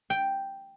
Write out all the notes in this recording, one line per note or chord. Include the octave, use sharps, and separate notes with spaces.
G5